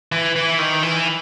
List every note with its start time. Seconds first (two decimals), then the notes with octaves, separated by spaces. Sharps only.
0.12 E3
0.36 E3
0.59 D#3
0.83 E3